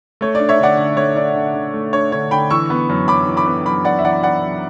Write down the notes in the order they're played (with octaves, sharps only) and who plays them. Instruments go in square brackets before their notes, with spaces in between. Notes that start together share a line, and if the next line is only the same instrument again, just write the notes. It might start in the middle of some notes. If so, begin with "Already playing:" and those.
[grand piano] A3 C#5
D5
D4
C#5 E5
D3 D5 F#5
D3
A3 C#5
D4 D5
D3
D3
A3
D4 C#5
D3 C#5
D3 G5 B5
E3 C#6 E6
B3
F#2
F#2 B5 D6
E3
B5 D6
B3
F#2 B5 D6
F#2 D5 F#5
E5
E3 D5 F#5
B3 D5 F#5
F#2